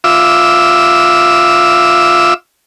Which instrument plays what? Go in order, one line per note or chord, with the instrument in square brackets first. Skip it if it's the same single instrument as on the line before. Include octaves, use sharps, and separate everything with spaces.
[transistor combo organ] F4 E5 D6 E6